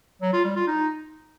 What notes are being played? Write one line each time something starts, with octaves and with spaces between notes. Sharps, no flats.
F#3
F4
G3
F4
D#4